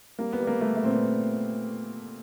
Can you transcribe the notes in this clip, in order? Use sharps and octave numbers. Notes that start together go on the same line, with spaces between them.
G3 A#3
B3
G3
A#3
G3 A3
A3
A#2 C4
B3